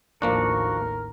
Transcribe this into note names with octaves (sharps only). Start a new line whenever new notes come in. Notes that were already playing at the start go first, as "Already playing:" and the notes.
A1 D#2 F3 A#3 D4 F#4 A#4